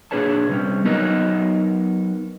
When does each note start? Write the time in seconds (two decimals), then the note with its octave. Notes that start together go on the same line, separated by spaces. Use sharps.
0.11 A#2 D4 G#4 B4 C#5 A5
0.49 C3 G3 C#4
0.84 F#3 B3 D#4 A#4 B4 D#5